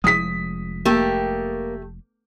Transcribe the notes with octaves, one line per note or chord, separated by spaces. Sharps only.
F1 F3 G#3 D#6 B6
A3 A#3 G4